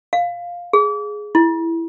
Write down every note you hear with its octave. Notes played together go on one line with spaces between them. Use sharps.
F5
G#4
E4